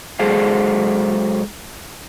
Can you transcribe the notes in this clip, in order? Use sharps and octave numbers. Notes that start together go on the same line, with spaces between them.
F#3 G#3 G#4 A4 C5 F5